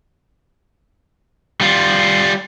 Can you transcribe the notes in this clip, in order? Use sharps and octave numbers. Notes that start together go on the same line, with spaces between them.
G3 F4